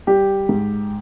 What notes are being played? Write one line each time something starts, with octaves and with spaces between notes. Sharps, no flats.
G3 G4
G#2